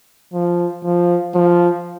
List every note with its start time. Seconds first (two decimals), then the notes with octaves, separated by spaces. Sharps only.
0.33 F3
0.83 F3
1.35 F3